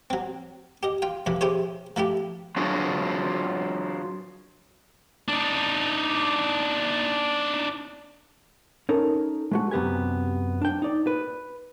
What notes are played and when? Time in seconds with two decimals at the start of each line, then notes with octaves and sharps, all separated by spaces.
0.10 F#3 C4
0.83 G4 D#5
1.02 F4 G5
1.26 F2 C3 E3 F3
1.41 E4 G4 G#4 C5 C#5
1.96 F3 A3 E4 G4
2.56 F#3 D4 F4 F#4 G#4
5.28 D4 D#4
8.89 C#4 D#4 A4 A#4
9.52 G#3 A3 F#4
9.71 F#2 C3 B3 G4 G#5
10.62 D4 G5
10.82 D#4 D5
11.07 B4